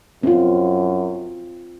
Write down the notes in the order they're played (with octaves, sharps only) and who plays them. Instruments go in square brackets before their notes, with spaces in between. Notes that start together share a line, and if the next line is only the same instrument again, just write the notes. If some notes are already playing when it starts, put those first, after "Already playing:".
[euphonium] F#2 [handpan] C4 F4